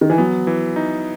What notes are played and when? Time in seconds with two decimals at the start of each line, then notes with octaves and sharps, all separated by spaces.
0.01 D#3
0.10 E3
0.18 F#3 B3
0.47 E3
0.76 D#4